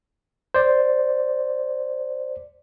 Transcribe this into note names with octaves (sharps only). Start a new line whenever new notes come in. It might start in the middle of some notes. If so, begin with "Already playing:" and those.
C5 D5